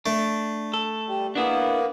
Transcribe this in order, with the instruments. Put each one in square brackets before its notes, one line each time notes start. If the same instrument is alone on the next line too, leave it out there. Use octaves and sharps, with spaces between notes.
[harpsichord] A3 [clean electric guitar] D4
[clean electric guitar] A4
[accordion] G3
[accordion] A#3 B3 [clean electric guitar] D4 E4 G#4